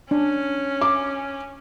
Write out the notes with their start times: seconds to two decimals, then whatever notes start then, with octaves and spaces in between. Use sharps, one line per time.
0.11 C#4 D4
0.81 D6